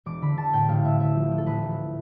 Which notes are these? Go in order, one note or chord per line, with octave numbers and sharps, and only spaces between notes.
E1 D6
D3 B5
D3 A5
A2 G5
A1 F5
A2 E5
D2 E5
F3
F3
A4
A1 B4
A1